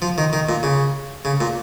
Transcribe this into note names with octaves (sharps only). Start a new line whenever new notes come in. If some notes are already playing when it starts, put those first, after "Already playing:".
F3
D#3
D#3
A#2
C#3
C#3
A#2